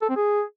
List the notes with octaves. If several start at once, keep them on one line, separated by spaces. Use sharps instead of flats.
A4
C4
G#4